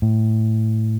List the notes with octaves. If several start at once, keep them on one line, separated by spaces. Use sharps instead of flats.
A2